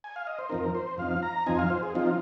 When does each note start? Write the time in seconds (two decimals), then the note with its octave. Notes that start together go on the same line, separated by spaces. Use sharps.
0.04 G#5
0.16 F5
0.27 D#5
0.39 C5
0.49 F2 F3 C4 D#4 A#4
0.75 C5
0.98 F2 F3 C4 D#4 F5
1.23 A#5
1.46 F2 F3 C4 D#4 G#5
1.59 F5
1.70 C5
1.83 G#4
1.95 F3 C4 D#4 F4